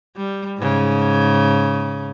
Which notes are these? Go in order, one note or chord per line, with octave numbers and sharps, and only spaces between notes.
G3
G#2 C#3